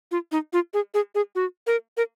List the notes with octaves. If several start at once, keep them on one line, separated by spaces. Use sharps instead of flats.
F4
D#4
F4
G#4
G#4
G#4
F#4
A#4
A#4